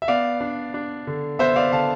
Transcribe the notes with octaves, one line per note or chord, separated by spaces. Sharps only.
E5
B3 D5 F5
D4
D4
D3
B3 C5 E5
D5 F5
D3 F5 A5